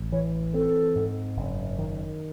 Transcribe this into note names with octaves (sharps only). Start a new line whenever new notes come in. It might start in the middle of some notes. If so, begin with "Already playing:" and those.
Already playing: A1
E3 C#5
C4 A4
G#2
F#1
D#3